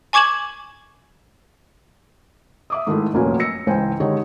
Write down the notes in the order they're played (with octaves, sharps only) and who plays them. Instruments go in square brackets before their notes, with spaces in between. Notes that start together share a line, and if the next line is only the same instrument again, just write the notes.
[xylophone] G#5 C#6 D6 G#6 E7 F#7
[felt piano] E5 D6 D#6
G#2 D#3 A3 E4
F1 F#2 A#2 F#3 C#4 G#5
E6 A#6 C#7
C#2 G#2 E3 C5 G5 G#5
D3 D#3 G#3 D#4 G4 C#5